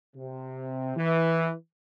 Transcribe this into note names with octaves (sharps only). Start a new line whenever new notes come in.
C3
E3